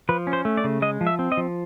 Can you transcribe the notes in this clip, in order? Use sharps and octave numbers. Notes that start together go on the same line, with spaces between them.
F3 B4
C#4
C5
A3
D5
C#3
G#3 D#5
F3
E5
C4
D#5
F3